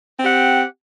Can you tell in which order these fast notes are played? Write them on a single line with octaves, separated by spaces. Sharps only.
C4 G4 F#5